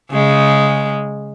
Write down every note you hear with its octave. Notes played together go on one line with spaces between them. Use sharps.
C#3 G#3